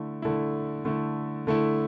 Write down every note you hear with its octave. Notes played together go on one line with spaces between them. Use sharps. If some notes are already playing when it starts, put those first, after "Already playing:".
Already playing: D3 A3 E4
D3 A3 E4
D3 A3 E4
D3 A3 E4